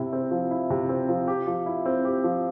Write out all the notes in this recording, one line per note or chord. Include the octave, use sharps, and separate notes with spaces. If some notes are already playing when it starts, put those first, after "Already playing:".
Already playing: C3 E4
C4
F3
E4
C3
C4
F3
G4
F3
E4
C4
G4
F3